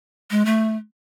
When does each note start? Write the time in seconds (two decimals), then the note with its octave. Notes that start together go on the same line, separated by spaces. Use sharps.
0.31 G#3
0.45 A3